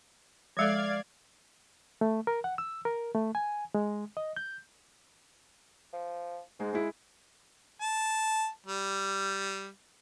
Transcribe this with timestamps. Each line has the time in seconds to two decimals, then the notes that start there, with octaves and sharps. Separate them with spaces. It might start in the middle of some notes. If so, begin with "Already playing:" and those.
0.57 F3 G#3 A4 D5 F5 G#6
2.01 A3
2.27 A#4
2.44 F#5
2.58 E6
2.85 A#4
3.15 A3
3.35 G#5
3.75 G#3
4.17 D#5
4.36 G6
5.93 F3
6.60 G#2 G#3
6.73 G#3 E4
7.81 A5
8.66 G3